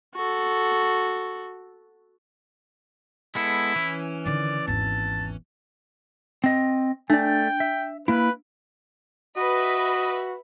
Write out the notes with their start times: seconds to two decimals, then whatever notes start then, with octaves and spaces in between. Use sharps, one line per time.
0.15 F#4 A4
3.35 G#3 B3 E4 A4
3.76 E3 C#4
4.26 D3 D#3 D5
4.68 G#1 E2 A5
6.44 C4 D#5
7.10 A3 D4 D5 G5
7.60 E5
8.08 A#3 E4 B4
9.37 F#4 B4 D#5 E5 B5